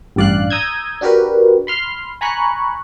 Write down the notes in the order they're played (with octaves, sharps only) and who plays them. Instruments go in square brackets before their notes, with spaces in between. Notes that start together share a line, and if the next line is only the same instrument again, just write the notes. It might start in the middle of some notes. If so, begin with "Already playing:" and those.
[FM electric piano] A1 G2 D5 F5 F#6
A#5 D#6 E6 G6 G#6
D4 F#4 G4 A#4 B4
B5 C6 F6
G#5 A#5 B5 C#6 F#6